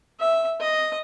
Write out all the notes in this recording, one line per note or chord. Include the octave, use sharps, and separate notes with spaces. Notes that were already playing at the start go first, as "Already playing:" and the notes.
E5
D#5